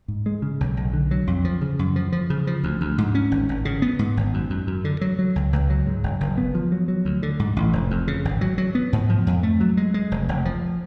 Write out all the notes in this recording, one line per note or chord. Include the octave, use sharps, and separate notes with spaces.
G#2
G#3
C#3
B1
B1
D3
F#3
F2
F3
C#3
F#2
F3
F3
C#3
F3
D2
D2
G#2
C#4
G#1
G#1
C#3
B3
G#2
G#1
F#2
F#2
F#2
D3
F#3
F#3
C#2
C#2
F#3
G#2
F#1
F#1
B3
F3
F#3
F#3
D2
D3
G#2
A1
F1
F2
C#3
G#1
F#3
F#3
B3
G#2
F3
F2
A3
F#3
G#3
G#3
F1
F1
F3